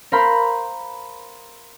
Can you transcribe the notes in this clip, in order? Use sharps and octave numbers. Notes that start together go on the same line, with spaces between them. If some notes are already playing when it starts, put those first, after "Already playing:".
A#4 C5 F5 B5